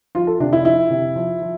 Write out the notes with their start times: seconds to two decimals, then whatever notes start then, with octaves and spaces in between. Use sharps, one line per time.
0.15 F3 F4
0.27 A4
0.40 C3 D4
0.53 E4
0.65 F3 E4
0.90 C3
1.16 F3
1.42 F3